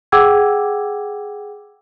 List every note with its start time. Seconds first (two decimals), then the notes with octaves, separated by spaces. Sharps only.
0.12 G#4 F#5 G5 D6 E6 G#6